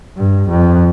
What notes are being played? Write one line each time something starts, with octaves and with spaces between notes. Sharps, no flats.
G2
F2